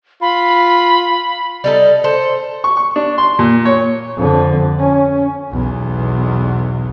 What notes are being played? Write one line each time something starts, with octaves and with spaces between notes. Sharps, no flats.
F4 B5
G3 D#4 A4
A4 C5
C#6
C#6
D4
C6
A#2
C#5
F2 D3
C#4
B1 E2